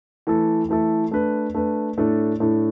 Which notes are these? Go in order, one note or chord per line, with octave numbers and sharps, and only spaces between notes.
E3 A3 E4 A4
E3 A3 E4 A4
A3 D4 B4
A3 D4 B4
A2 A3 D4 A4
A2 A3 D4 A4